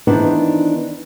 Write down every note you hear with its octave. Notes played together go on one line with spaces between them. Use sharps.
D#3 E3 B3 D4 D#4 C5